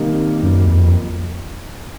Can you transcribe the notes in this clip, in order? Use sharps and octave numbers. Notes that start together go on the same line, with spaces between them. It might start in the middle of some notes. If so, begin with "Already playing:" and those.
Already playing: C3 D#3 G3 A#3 D#4
F#2
E2
F2